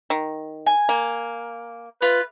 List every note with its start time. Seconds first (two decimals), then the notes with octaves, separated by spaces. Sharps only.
0.10 D#3
0.67 G#5
0.89 A#3
2.02 F4 B4